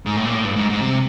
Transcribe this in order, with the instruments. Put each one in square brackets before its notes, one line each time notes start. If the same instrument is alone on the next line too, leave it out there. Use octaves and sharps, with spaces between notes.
[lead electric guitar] G#2
A2
A#2
A2
G2
G#2
G#2
C3